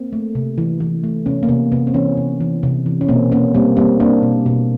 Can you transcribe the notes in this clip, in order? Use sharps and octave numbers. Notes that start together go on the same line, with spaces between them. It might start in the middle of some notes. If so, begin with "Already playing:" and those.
Already playing: A#3 C4
A3
C3
E3
E3
A3
C3 B3 C#4
A#3
C3 B3
C3 B3
C4
E3 B3 C#4
C3
E3
C3
E3
C#4
B2 A#3 C4
A#3 B3 C#4
G3 A#3 C4
G3 A#3 C4
A#3 C4 D4
B2
B2